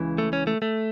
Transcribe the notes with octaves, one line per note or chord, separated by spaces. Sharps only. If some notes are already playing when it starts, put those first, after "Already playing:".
Already playing: C#2 C#3 E3
A3
C#4
A3
A3